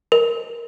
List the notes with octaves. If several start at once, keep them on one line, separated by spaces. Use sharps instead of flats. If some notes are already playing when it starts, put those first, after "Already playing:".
A#4